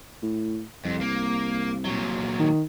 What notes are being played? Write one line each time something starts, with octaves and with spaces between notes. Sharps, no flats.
A2
C2 F2
A#3
A#2 F#3
D#3